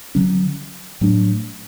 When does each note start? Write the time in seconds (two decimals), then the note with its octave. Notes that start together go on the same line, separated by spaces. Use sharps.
0.15 D3 F#3 C#4
1.01 A2 F#3 A3 D4